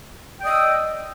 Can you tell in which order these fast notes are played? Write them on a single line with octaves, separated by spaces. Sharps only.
G5 D5 D#6 D#5 E6